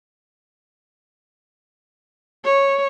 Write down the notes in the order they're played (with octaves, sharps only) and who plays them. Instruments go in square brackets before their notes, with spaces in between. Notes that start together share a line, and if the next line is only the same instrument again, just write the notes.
[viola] C#5